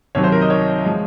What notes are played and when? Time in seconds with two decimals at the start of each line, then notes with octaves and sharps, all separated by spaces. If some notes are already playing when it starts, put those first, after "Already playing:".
0.15 C2 C3 D#3 F#3 C#5
0.24 C5
0.32 A#4
0.41 D#5
0.50 C#5
0.85 F3 G#3